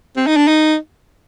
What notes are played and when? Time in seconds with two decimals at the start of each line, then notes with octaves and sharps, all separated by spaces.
0.17 C4
0.27 D#4
0.37 D4
0.48 D#4